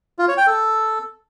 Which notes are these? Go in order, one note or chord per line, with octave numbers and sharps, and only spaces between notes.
F4
C#5
G5
A4